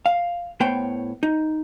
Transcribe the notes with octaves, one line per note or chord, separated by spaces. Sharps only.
F5
A2 B3 C5 C#5 G5
D#4